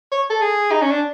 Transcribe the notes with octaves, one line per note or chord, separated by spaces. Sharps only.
C#5
A4
G#4
D#4
C#4
D4